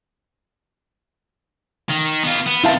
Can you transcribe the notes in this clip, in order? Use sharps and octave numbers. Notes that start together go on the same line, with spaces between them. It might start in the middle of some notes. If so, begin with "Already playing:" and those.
D#3
B3 F4
B3
C3 D#3 E4 F5 A5